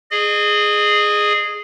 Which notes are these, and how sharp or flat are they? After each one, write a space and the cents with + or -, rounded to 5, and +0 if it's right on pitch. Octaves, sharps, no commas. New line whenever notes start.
G#4 +0 D#5 -40